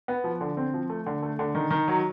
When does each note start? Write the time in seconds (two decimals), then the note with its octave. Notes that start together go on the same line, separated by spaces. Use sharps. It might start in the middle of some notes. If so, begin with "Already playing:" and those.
0.08 B3
0.24 F3
0.41 D3
0.57 C4
0.74 F3
0.90 A3
1.06 D3
1.23 A3
1.39 D3
1.55 D#3
1.71 D#3
1.88 F#3